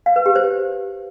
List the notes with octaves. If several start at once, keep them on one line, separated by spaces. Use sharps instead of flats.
F5
B4
G4
C5